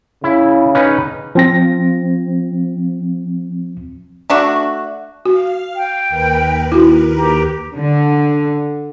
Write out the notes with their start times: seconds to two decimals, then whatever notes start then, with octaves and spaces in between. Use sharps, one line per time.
0.24 C#3 E4
0.75 C#4 D#4 B4
1.35 F3 C4 A#6
4.30 A3 D4 F#4
5.25 F#4 F5
5.75 G5
6.09 D#2 A#4 B4
6.72 E4 F#4
7.16 G4 A#5
7.76 D3